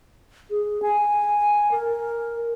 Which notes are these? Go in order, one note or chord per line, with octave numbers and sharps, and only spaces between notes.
G#4
G#5
A#4